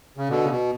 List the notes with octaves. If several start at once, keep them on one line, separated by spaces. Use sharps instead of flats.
C#3
B2 D3
C#3
B2